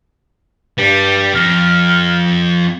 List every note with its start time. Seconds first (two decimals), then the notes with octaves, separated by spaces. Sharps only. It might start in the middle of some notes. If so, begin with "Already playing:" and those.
0.78 G2 G3
1.34 F2 F6